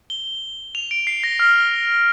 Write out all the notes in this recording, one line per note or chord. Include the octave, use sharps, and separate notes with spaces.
G7
F7
D7
C7
A#6
F6